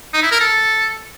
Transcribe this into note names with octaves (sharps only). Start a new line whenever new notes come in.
D#4
E4
A#4
A4